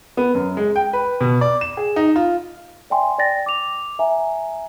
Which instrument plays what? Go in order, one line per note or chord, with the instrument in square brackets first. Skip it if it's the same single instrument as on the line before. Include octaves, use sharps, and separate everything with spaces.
[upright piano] B3
F#2
G#3
G5
B4
B2
D5
E7
G#4
D#4
F4
[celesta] D5 E5 G5 G#5 C6
D5 G5 A6 A#6
D6 F7
E5 G#5 A#5